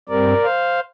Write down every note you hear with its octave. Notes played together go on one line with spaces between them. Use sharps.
G2 G3 C4 A#4 D5
C5 F5